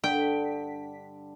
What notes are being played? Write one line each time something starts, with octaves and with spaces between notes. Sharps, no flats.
G2 D3 D4 G5 B6